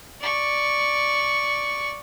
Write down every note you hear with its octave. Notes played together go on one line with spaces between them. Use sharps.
D5 C#6